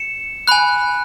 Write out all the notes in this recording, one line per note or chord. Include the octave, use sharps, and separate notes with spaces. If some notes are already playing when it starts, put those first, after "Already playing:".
Already playing: C#7 E7
G#5 B5 F#6